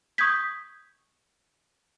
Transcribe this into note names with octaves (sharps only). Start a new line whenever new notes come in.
C#6 D#6 G6 G#6 B6